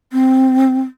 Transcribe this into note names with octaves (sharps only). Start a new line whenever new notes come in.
C4